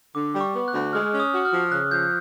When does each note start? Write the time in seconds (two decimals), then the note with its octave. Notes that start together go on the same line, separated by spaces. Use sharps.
0.15 D3 D6
0.35 G3
0.41 C#6
0.54 B3
0.68 F#6
0.74 D2
0.93 G#3 F6
1.13 C#4
1.20 D#6
1.33 F#4
1.45 F6
1.53 F3
1.72 C#3 F#6
1.91 F3 G6